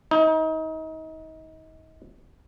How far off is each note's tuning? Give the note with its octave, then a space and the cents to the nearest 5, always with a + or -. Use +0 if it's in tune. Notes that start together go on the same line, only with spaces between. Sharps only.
D#4 +35